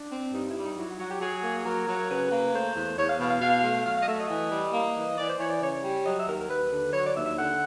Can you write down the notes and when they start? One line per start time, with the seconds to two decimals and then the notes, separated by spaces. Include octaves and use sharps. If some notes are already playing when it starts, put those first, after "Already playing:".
Already playing: D4
0.11 C4
0.33 G2 D#4
0.49 E4
0.56 G3
0.63 D#4
0.77 F#3 E4
0.89 F#4
0.99 F#3 F#4
1.11 G4
1.21 F#3 G#4
1.44 A#3
1.65 F#3 A#4
1.88 F#3
2.09 C#3 B4
2.32 A#3
2.53 A3 C5
2.76 E2
2.97 E2 C#5
3.08 F5
3.19 B2 F5
3.30 F5
3.41 B2 F5
3.63 A3
3.85 F#3 F5
3.96 F5
4.02 D#5
4.07 A3 E5
4.19 D#5
4.29 E3
4.51 G3
4.73 A#3
4.95 E3
5.18 E3 D5
5.28 C5
5.39 E3 C#5
5.50 D5
5.60 C#3 C#5
5.83 G3
6.05 F#3 D#5
6.16 E5
6.27 D#2 A#4
6.38 A#4
6.48 D#2 B4
6.71 D3
6.92 F#3 C#5
7.04 D5
7.15 D#2 E5
7.25 E5
7.37 D3 F#5